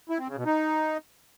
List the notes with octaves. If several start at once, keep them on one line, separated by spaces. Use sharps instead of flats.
E4
C4
C#3
B2
D#4